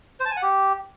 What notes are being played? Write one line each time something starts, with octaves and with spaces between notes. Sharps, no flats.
C5
A5
G#5
F#5
G4